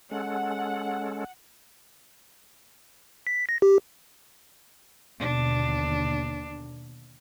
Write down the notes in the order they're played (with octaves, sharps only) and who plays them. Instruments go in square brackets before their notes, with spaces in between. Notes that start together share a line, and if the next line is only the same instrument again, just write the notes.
[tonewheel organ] G#3 C#4 A4 [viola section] F#5
[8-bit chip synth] B6
A#6
G4
[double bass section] D#2 B2 D3 [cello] D4